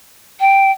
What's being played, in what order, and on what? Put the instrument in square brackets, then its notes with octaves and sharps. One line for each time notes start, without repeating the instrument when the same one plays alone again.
[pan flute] G5